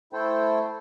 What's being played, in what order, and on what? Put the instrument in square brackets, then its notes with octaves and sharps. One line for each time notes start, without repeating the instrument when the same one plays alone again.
[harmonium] A3 E4 A4 C5 G5